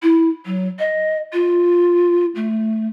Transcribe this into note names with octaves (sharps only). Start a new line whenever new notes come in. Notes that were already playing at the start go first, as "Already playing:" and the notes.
E4
F#3
D#5
F4
A3